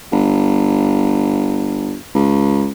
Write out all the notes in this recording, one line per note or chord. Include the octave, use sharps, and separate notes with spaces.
G1
C#2